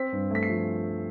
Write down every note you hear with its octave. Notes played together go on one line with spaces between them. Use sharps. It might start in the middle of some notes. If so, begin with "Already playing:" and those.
Already playing: C4 B6
G2
A3 B6
C7
F3